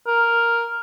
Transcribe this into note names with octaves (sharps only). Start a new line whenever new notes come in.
A#4